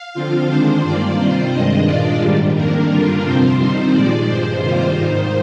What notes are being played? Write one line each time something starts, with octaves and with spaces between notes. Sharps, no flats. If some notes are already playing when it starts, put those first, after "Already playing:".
Already playing: F5
D3 F3 C4 F4
D#3 G#3 D4 C5
G2 D#3 A#3 F4 D5
C3 D#3 G3 C4 F4 C5
G2 D#3 G#3 D4 D#5
A#2 G#3 D4 F4 D5
G#2 D#3 G3
F2 D#3 A#3 D4 A#4
G2 D3 G3 D4 F4
F2 C3 F3 C4 F4 C5
D#3 G3 C4 D#4 C5
A#2 F3 G#3 D5
G2 F3 G#3 C5
C3 D#3 G3 A#3 F4 C5
G#2 D#3 A#3 D#4 C5